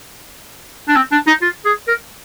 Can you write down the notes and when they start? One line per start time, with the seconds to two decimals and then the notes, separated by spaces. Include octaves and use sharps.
0.89 D4
0.96 C4
1.12 D4
1.27 D#4
1.42 F4
1.65 G#4
1.88 A#4